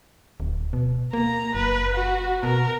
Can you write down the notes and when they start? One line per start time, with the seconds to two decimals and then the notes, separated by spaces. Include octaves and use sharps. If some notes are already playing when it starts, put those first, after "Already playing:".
0.40 D1
0.73 B2
1.13 A#3 A#5
1.55 F#1 B4
1.95 F#4
2.43 B2 A#4